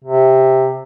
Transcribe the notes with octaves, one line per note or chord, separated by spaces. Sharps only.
C3